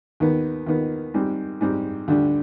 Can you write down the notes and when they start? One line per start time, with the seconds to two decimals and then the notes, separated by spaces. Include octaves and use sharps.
0.20 D#2 D#3 B3
0.67 D#2 D#3 B3
1.14 G#2 G3 C4
1.61 G#2 G3 C4
2.08 D2 D3 G3 D4